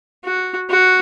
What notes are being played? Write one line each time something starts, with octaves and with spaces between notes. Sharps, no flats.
F#4
F#4